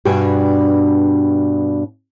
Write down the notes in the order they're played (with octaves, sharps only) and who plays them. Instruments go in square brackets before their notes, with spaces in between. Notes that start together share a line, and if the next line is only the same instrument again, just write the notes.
[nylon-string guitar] G2 B2 D4 G5 G#5